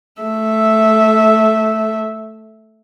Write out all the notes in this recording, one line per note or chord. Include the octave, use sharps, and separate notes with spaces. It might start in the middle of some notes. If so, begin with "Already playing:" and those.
A3 E5